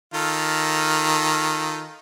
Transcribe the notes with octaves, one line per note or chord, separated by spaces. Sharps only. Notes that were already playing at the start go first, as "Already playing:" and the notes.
D#3 F4 A4